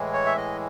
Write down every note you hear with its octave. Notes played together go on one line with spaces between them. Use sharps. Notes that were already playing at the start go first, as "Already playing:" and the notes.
Already playing: A2 E3 G#3
C#5
E5
D#5